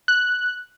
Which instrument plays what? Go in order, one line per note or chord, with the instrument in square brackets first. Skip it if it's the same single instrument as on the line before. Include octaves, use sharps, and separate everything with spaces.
[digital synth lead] F#6